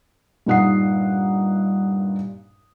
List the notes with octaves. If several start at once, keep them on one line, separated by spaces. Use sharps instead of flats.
G2 A#2 D#4 F#5 D#6 C7